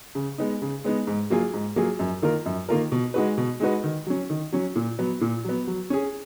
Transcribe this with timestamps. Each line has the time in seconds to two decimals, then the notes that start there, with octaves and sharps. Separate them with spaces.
0.15 C#3
0.38 G#3 B3 D#4
0.62 C#3
0.84 G#3 B3 D#4
1.07 G#2
1.30 F#3 A#3 F4 G#4
1.54 G#2
1.76 F#3 A#3 F4 G#4
1.99 F#2
2.22 D#3 A#3 F4 A#4
2.46 F#2
2.69 D#3 A#3 F4 A#4
2.92 B2
3.14 G#3 D#4 F#4 B4
3.37 B2
3.60 G#3 D#4 F#4 B4
3.84 D#3
4.07 F#3 C#4
4.30 D#3
4.52 F#3 C#4
4.76 A#2
4.99 F#3 B3
5.21 A#2
5.44 F#3 B3
5.67 F#3
5.90 C#4 G#4